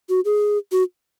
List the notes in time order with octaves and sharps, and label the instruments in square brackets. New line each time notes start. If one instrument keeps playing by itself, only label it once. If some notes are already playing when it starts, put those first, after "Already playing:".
[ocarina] F#4
G#4
F#4